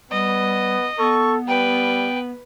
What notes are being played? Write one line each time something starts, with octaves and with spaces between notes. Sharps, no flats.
G3 B3 D#5
B3 A4 C#6
G3 B4 G5